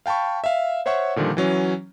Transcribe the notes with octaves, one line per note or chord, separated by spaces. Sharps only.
F5 G5 A5 B5 C#6
E5 F5
C5 C#5 E5 F#5 C#6
A#2 D3 D#3 F3 G3
E3 F#3 C#4